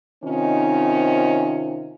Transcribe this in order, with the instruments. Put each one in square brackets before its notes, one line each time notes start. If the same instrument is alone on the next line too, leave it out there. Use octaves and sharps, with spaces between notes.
[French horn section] C3 D#3 C4 C#4 D#4 F4